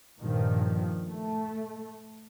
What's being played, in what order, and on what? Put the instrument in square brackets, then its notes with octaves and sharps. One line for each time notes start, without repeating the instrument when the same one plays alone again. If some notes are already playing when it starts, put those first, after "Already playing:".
[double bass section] G2 A#2 D#3 F3
A3